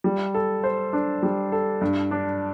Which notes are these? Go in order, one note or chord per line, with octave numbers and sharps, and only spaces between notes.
G3
A4
C5
D4
G3
A4
G2
D4